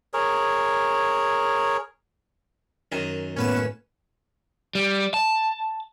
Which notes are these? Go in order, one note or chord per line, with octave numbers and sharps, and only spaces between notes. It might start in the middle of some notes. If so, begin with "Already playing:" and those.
G#4 A#4 C#5
F#2 D#3 G#5
A2 A#3 B3 C#4 B4 E7
G3
A5